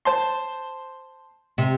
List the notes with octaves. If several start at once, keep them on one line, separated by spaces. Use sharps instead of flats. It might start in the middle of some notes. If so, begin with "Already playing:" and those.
C5 A5 C6
C3